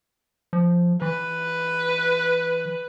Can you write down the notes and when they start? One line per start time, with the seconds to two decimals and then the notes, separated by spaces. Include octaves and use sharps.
0.53 F3
1.02 E3 B4